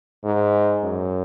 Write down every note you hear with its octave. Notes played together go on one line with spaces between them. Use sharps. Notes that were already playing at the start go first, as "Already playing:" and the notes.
G#2
F#2